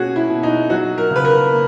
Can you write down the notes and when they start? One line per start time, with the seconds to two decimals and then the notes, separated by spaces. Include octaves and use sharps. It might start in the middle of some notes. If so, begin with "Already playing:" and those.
Already playing: B2 A#3 C#4 F#4 G#4
0.16 E4
0.29 B2
0.43 D#4
0.70 F#3 F#4
0.98 A#4
1.11 C#3 B4
1.25 A#4
1.52 A#3